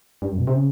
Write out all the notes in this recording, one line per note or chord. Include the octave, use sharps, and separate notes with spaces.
G2
F#2
B2
C3
C#3